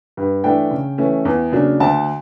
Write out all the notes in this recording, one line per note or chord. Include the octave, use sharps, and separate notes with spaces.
G2
E3 A3 D4 G5
C#3
E3 A3 C#4
E2
C#3 F#3 A#3 D4
D2 A5